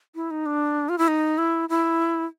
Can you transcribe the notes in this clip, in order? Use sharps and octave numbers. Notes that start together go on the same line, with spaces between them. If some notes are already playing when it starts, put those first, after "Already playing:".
E4
D#4
D4
F4
E4
D#4
E4
E4